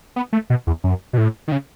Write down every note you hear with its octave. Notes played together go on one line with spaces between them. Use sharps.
B3
A3
B2
E2
F#2
B2
A2
D#3
C#3